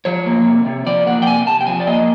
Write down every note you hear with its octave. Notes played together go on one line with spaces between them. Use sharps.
F3 C#5
A#3
C3
C3
F3 D5
A#3 F#5
G5
C3 G#5
C3 A5
G5
F3 G#5
D5
A#3 D#5